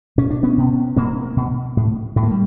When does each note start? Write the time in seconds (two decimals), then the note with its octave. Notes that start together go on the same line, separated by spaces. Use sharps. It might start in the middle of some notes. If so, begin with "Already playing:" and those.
0.18 B2 C#4
0.30 D4
0.43 B3 C#4
0.57 B2
0.96 B2 A#3 C4
1.37 B2
1.77 A2
2.16 A2 A3
2.23 A#3
2.31 G3